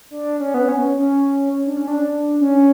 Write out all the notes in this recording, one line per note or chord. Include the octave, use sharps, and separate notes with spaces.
D4
C#4
B3
C#4
C#4
D4
C#4
D4
C#4